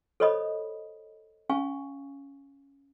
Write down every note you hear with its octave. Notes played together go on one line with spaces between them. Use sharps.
A4 C5 C#5 D#5 B5 D#6
C#4 F5 G#5 C#6